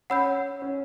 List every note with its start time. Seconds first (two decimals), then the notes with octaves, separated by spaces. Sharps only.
0.10 C#4 F#5 B5 E6 G6
0.62 C#4